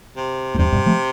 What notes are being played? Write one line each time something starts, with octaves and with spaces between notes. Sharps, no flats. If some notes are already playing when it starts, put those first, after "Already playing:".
C3
A2
E2 G2 C3
G2 B2
F3 A3